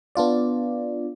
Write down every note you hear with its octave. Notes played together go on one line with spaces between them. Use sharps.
B3 D4 F4 D5